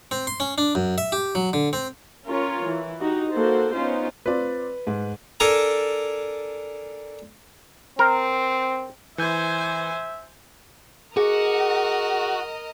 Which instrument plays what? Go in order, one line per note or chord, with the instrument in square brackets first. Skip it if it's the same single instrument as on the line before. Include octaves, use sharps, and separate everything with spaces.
[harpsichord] C4
C6
C#4
D4
F#2
E5
G4
F#3
D3
C4
[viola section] C#4 F4 A#4 C#5
E3
D#4 F#4 G4
A#3 F#4 A4 C5
B3 C#4 D#4 F4 C5
[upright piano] C4 F4 D5 [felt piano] B4
[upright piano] G#2
[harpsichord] D4 A4 A#4 G#5 A#5
[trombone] C4 [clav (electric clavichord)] A#4
[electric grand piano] E3 G6 [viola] C5 G#5 [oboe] E5
[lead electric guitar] F#4 [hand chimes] G#4 [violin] A#4 D#5